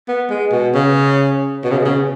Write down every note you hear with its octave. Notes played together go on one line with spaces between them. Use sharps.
B3
G#3
B2
C#3
B2
C#3
B2
C#3